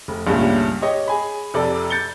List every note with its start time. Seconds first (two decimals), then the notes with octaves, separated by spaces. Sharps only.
0.08 F1
0.27 C#2 G2 A#2 C#3 A3 C#4
0.82 G4 C#5 D#5
1.08 G#4 G#5 B5
1.54 F2 C3 A4 D5
1.90 G6 A6 C#7 G7